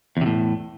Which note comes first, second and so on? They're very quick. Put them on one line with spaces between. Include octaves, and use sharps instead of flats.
E2 C3 A2